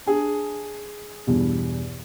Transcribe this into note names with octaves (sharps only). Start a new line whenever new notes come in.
D4 G#4
E2 G2 B2